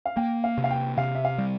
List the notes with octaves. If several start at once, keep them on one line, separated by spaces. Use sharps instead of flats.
F5
A#3 G5
F5
C3
F5
G5
C3 F5
E5
F5
G3